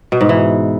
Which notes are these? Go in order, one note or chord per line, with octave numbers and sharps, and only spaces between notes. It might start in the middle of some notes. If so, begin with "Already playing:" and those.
B2
G#2
E3